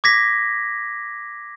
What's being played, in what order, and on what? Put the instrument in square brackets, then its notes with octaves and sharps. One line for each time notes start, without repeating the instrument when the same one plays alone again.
[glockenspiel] D6 G#6 A#6 B6